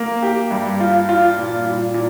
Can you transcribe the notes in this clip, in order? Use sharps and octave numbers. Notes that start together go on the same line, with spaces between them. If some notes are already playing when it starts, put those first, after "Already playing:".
Already playing: A#3
G4
G2
F4
F4
A#2
A#2
A#2